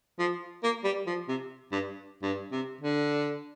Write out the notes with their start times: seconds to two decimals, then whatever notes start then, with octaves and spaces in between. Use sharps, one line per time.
0.19 F3
0.63 A#3
0.84 G3
1.07 F3
1.28 C3
1.72 G2
2.23 G2
2.52 C3
2.81 D3